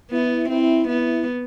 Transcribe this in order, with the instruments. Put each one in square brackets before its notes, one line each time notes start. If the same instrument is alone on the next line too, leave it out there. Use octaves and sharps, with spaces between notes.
[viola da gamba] B3 [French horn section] E4
[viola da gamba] C4 [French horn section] E4
[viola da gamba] B3 [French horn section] E4